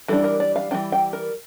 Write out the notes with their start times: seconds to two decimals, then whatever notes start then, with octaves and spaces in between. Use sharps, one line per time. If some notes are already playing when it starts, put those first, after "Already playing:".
0.08 E3 G3 D4 A4
0.24 A#4
0.40 D5
0.56 F5
0.71 E3 G3 D4 G5
0.92 G5
1.13 A#4